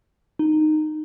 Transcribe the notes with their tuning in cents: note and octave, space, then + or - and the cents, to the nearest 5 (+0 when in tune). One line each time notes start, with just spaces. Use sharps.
D#4 -10